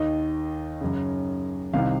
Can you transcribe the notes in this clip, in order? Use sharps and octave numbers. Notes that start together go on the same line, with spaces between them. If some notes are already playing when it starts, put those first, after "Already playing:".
Already playing: D#2 D#3 D#5
F#2 C#3
C2 C3 D#3 F5